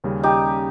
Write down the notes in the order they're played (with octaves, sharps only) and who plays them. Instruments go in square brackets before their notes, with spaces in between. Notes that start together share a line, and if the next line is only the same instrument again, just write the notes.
[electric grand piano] D#2 C#3 G3 C#4
[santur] D#4 G4